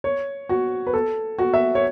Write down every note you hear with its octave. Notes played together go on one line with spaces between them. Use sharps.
C#5
F#4
B4
A4
F#4
E5
C#5